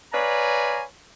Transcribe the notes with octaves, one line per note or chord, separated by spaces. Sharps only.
B4 C#5 D5 F5 G#5 A#5